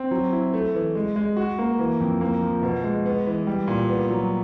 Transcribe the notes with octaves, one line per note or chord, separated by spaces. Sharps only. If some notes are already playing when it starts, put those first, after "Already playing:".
Already playing: C4
F#3
E4
A3
E3
G#3
G#3
F#4
A#3
E3
F2
A#3
F3
B2
G#3
B3
E3
G3
A#2
B3
F#3